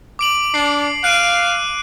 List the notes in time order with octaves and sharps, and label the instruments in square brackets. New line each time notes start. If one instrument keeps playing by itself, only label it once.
[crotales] D6 D7 F#7
[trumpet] D4 [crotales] C7
[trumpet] F5 [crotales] F#6 D7 D#7